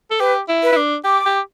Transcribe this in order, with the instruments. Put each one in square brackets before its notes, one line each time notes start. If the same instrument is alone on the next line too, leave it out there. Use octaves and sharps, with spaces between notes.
[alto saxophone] A4
[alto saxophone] G4 [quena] B4
[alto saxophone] E4
[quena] B4
[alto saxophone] E4
D4
[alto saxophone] G4 [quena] D6
[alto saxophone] G4